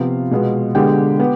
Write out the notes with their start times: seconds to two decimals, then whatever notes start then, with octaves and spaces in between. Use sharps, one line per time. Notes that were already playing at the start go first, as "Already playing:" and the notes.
Already playing: C3 F3 B3 F4 F5
0.31 B2 G#3 B3
0.75 D3 G#3 B3 G4 G5
1.19 B3